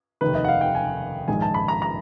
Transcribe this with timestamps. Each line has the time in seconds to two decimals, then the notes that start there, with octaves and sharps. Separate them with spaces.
0.21 F1 D#2 D#3 B4
0.35 D#5
0.44 F#5
0.48 F5
0.61 G5
0.75 G#5
1.28 A#1 G#2 D#3 G#3 G#5
1.42 A5
1.54 B5
1.68 A#5
1.82 A#5